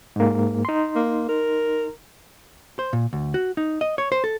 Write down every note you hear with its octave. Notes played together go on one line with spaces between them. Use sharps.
G#2 A#3
D#4 C6
A#3
A#4
C5
A#2
D2
F#4
D#4
D#5
C#5
C5
A4